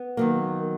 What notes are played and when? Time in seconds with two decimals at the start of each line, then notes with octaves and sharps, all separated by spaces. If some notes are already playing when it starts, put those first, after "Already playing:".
Already playing: B3
0.17 D#3 F#3 A#3